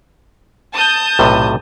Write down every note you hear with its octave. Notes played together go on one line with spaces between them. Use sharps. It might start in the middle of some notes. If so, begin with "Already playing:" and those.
A5 D#6 G6
B1 A2 C3